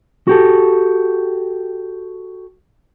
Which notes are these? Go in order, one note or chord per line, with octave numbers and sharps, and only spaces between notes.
F#4 G4 A4